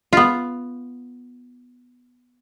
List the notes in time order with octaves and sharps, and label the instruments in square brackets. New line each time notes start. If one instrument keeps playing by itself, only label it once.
[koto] B3 F4